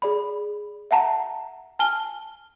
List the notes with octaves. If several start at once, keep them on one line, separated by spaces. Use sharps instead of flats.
G#4 D5 B5
E5 F#5 A5 A#5
G#5 A5 F6 G7